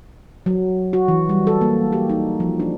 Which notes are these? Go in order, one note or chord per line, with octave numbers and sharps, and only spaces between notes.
F#3
F#4
E3
G3
A4
A#3
G4
D#4
F3
D4